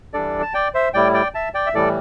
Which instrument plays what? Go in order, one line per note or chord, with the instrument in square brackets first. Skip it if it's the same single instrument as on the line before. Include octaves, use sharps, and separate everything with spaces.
[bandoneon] E3 G3 D4 A4 D5
A5
D5 G5
C5 E5
A2 G3 E4 D5 G5
D5 G5
E5 A5
D5 G5
E5
A2 E3 G3 A4 D5